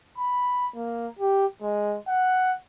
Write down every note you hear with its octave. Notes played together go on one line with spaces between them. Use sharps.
B5
A#3
G4
G#3
F#5